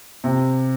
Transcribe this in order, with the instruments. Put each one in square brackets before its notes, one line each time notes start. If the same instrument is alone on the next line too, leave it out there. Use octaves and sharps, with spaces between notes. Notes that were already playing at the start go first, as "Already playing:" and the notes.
[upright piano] C3